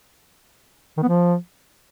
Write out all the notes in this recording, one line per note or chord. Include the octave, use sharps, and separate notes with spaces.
D#3
B3
F3